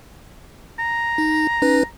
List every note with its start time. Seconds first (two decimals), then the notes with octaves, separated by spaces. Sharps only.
0.79 A#5
1.18 D#4
1.62 C#4 D#4 B4